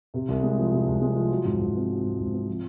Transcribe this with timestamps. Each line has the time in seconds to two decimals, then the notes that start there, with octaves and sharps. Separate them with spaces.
0.14 C3
0.28 C2
0.43 G#3
0.58 F3
0.73 C3
0.87 C2
1.02 G#3
1.16 F3
1.30 F#3
1.45 G#2
1.59 G#2
1.75 C4
1.89 F#3
2.04 G#2
2.18 G#2
2.33 C4
2.47 F3